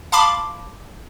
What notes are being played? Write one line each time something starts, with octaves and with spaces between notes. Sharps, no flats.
F5 A5 B5 C6 D6